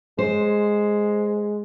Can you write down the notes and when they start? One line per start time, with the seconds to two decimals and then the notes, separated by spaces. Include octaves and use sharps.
0.19 G#3 C5